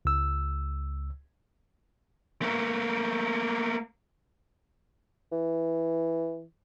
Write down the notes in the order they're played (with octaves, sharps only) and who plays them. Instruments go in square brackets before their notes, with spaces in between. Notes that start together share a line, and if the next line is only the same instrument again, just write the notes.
[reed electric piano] C#2 E6
[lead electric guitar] A3 A#3
[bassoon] E3